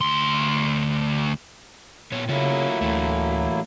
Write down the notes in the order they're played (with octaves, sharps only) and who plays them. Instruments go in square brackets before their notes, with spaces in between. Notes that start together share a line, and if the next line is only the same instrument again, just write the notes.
[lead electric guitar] D2 C6
[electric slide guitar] A#2 B3 C#5
[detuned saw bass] C#3 [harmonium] F#3 A#3 E4 [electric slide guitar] A3 F4 C#5
[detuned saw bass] D2 [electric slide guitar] E3 A3